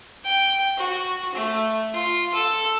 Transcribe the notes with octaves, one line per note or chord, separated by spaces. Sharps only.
G5
F#4
A3
F4
A4